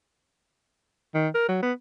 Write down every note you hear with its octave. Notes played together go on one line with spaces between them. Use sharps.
D#3
A#4
F#3
B3